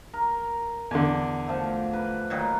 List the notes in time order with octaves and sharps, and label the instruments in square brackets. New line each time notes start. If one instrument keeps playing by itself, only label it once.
[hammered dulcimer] A#4
[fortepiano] E2 D3
[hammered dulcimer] F3 A3
B4
A#2 D#3 F#3